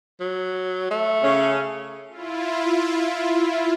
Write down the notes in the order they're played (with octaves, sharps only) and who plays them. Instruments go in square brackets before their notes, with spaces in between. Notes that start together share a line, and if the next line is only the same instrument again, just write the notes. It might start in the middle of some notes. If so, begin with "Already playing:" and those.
[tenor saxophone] F#3
A3
[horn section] C#3 C#4
[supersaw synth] E4 F4